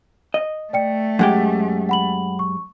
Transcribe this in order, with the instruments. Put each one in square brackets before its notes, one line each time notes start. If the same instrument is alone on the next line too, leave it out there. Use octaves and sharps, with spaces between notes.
[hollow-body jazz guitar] D#5
[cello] A3 [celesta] D5 G5 C#7
[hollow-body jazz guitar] F#2 G#3 G4 [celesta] F#5
[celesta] F#5 B5 F#7
C#6